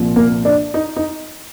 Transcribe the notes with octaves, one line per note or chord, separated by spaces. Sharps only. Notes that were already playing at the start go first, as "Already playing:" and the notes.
Already playing: C2 A#2 F3
A#3
D4
D#4
D#4